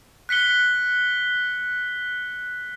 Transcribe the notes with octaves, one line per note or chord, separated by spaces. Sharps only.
F#6 B6 C#7 G7